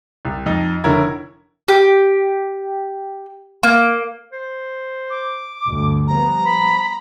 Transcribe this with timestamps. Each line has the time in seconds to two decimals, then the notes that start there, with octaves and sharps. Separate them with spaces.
0.25 C2
0.46 F2 D#4
0.84 F1 D3 C#4 E4 A#4 G#6
1.68 G4
3.63 A#3
4.32 C5
5.10 D6
5.67 D2 G2
6.07 F3 G3 B3 A#5
6.45 B5